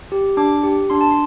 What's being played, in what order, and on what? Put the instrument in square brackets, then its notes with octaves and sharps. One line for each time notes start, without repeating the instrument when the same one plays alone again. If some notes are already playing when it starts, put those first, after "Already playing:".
[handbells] G4
D4 D6
G4
D4 C6
A5
C6